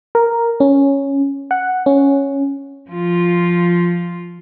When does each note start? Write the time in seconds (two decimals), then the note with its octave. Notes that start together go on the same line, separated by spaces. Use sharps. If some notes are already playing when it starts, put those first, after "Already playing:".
0.15 A#4
0.60 C#4
1.51 F#5
1.86 C#4
2.90 F3 F4